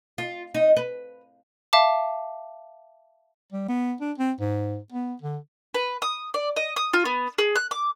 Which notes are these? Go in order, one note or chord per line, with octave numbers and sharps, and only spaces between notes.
F4
D#4
B4
E5 F5 A5 D6
G3
B3
D4
C4
G#2
B3
D3
B4
D#6
D5
D#5
D#6
F4
B3
G#4
F#6
D6